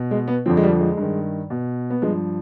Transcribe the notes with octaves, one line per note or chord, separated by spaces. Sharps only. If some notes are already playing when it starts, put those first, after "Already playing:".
Already playing: B2
G#3
B3
F2 D3 F3 C4
G#3
G3
G#3
G2 D#3
B2
B3
G2 F3 G#3